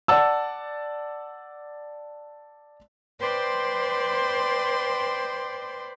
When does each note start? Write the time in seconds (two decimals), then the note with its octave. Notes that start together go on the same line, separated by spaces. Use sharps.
0.08 D5 F#5 A5 E6
3.20 B4 C5 D5 G5 C6